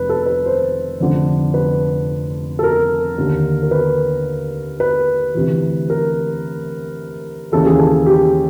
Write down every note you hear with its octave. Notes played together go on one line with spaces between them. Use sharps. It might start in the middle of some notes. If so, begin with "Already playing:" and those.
Already playing: F1 B4
A4
B4
C5
F1 F2 D3
B4
A4
A#4
D#2 D3
A#4
B4
B4
D2 C3 E3
A#4
D#2 C#3 E3 A4
G#4
A4
G4